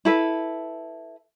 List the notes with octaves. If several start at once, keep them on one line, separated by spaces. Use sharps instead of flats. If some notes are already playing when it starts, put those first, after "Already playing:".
E4 A4 B4